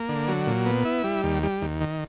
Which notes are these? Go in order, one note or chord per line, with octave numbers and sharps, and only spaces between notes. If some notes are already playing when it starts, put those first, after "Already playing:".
Already playing: A#3
D3
F#3
A#2
B3
E4
G3
D#2
G3
D#2
D#3